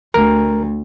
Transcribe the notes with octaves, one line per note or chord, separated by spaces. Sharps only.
D2 A#4